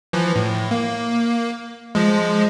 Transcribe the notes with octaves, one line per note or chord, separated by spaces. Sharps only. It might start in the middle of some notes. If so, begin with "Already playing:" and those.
E3 F3
A2
A#3
F3 G#3